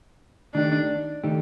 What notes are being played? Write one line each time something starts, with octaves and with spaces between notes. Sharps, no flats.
D#3 A3 D4 D#4 G4
D#3 A3 D#4 G4